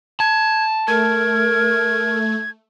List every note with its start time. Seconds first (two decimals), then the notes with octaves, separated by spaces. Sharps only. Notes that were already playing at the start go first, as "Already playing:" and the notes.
0.20 A5 G#6
0.88 A3 A#4 G#6